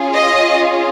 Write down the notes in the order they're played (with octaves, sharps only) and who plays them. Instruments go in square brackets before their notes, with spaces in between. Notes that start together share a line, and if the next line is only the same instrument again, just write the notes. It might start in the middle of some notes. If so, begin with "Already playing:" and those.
Already playing: [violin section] C#4 F4 G#4
D#5